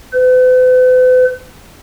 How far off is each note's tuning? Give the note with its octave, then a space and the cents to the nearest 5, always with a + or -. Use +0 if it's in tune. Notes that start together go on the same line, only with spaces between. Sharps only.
B4 +45